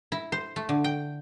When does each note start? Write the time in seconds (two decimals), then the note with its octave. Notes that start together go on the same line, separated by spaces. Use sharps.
0.12 E4
0.32 C5
0.56 A3
0.69 D3
0.84 G5